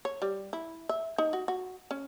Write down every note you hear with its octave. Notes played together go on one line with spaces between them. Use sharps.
C#5
G3
E4
E5
D#4
F#4
F#4
C#4